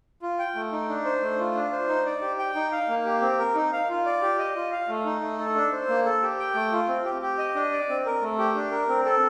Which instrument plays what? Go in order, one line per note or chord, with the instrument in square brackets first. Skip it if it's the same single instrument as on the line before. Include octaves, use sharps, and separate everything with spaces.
[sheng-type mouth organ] F4
G5
A3
D#4
D4
C5
A3
F4
D4
C5
D#4
D5
G4
G5
D#4
F5
A#3
G4
C4
A#4
D#4
F5
F4
D5
G4
D#5
F4
F5
A3
D#4
A3
A4
D4
C5
A#3
A4
G4
G5
A3
F4
C4
G4
G4
D#5
D4
D5
C4
A#4
A3
G4
D4
A#4
C4
A4